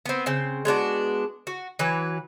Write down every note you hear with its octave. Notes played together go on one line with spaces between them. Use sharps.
B3 C4
C#3 C4
G#3 B3 D4 F#4
F#4
E3 F#3 B4